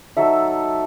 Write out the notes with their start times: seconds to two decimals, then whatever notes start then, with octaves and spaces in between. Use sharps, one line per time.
0.17 F#3 D#4 A4 E5